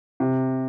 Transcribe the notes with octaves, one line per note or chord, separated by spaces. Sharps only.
C3